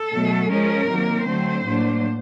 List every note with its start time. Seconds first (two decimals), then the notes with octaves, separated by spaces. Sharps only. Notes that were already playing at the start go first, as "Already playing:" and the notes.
Already playing: A4
0.13 B2 F#3 A3
0.50 F3 G#3 C#4 A#4
0.88 C3 D#3 F#3 A#3
1.26 D3 F#3 A3 C4 C5
1.65 A2 F#3 A#3 D4